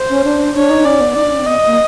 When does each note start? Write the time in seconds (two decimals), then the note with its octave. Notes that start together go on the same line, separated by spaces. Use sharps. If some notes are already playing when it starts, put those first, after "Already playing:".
Already playing: C5
0.09 C#4
0.24 D4
0.55 D4 C#5
0.70 D#4
0.85 C#4 D5
1.01 B3
1.15 D#4 D5
1.23 D4
1.31 C#4
1.38 C4
1.46 B3 D#5
1.66 A#3